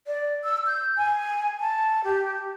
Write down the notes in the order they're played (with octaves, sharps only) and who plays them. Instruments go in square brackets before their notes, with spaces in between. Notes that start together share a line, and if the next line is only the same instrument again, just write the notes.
[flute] D5
E6
G6
G#5
A5
G4